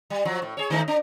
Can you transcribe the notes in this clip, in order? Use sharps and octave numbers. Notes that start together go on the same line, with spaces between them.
G3
F3 F#3
A2
G#4 C#5
D#3 A3 D#4
D4